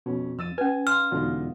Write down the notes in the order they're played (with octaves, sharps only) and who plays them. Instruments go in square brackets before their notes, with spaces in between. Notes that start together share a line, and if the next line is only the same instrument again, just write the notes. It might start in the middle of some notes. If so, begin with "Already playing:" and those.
[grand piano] F2 C#4 [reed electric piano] B2
[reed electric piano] F2 [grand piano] E6 A6 D#7
[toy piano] C#4 B4 [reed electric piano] G#5
[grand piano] F5 C6 E6 [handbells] F6
[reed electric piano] E2 B2 F4 [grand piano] D3 G#3 D#4